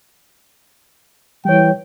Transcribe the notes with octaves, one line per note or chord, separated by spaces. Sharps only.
E3 G3 C#5 G5